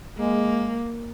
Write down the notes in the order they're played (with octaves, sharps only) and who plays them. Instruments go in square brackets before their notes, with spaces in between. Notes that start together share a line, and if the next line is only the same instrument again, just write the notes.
[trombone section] G#3 [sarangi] A#3